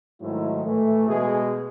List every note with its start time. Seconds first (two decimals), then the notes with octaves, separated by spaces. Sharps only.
0.22 G#2 D#3 F#3 A3 E4
0.65 A2 E3 A3
1.08 B2 G#3 G#4